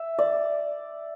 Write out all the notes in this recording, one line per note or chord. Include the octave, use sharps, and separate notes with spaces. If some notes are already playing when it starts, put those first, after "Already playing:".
Already playing: E5
D5